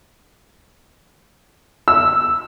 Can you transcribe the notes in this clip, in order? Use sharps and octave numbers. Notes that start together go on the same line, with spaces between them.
E6